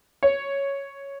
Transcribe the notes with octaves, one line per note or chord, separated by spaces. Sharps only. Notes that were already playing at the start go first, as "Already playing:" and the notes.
C#5